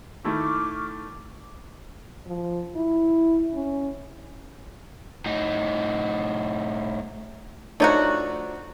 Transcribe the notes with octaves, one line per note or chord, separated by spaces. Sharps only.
D#3 A3 E4 C#6 D6 F6
F3
E4
C#4
A2 D#4
F3 A3 D4 D#4 F#4 C#5